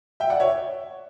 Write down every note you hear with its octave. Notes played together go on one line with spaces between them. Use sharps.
E5 G5
D5 F#5
C#5 E5